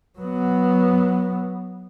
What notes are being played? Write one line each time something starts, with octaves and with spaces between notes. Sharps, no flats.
F#3 B3